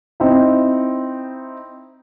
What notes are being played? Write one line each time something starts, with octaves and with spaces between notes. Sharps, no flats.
C4 D#4 E4